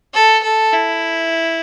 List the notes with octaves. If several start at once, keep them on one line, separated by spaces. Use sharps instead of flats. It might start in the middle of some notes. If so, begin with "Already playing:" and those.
A4
A4
E4